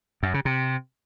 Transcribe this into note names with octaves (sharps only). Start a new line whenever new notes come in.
F#2
C#3
C3